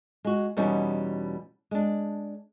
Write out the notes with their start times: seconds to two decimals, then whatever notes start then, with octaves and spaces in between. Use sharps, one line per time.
0.24 G#3 F#4
0.57 E2 B2 G3 B3 C#4 D#4
1.71 G#3 D4